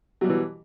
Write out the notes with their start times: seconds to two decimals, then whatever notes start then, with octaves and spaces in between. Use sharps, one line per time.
0.21 F#3
0.24 G3
0.27 B2
0.30 E3